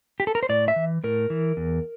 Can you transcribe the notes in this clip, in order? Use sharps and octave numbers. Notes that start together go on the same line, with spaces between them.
G4
A4
A#4
C5
A2 D5
E5
E3
A2 A#4
E3
E2